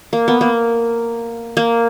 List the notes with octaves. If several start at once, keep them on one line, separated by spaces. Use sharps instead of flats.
A#3
B3
A#3
A#3